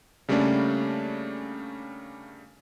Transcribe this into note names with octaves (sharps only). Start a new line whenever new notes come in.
C#3 G3 A3 A#3 C#4 D4